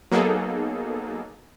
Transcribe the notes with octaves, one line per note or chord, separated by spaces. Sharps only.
F#3 A#3 B3 D#4 G#4 A4